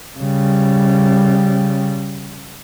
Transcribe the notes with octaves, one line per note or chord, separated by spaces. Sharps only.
C#3 G3